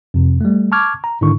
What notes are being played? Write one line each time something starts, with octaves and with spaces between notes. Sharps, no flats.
F2 C3
G3 A3
A5 C#6 D6 F6 G#6
A#5
G#2 D3 D#3 D4 E4 C#6